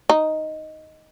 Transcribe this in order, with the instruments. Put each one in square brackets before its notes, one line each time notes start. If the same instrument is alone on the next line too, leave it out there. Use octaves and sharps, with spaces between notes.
[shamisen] D#4